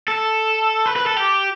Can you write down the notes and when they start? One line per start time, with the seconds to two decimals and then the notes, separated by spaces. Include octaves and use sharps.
0.08 A4
0.86 B4
0.96 B4
1.06 A4
1.17 G4